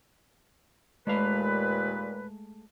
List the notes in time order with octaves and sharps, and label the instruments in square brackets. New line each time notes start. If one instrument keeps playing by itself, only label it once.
[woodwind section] D#2 A#2 B4 [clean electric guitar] G#3 A3 F5